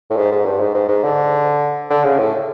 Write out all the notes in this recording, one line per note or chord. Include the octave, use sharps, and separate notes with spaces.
A2
G#2
G#2
G2
G#2
G#2
G#2
D3
D3
C#3
A2